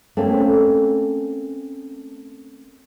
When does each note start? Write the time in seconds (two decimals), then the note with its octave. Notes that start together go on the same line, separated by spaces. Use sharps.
0.17 A3 A#3 C4 C#4